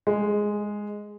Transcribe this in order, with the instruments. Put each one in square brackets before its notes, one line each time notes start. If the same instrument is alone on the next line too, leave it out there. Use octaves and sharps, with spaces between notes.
[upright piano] G#3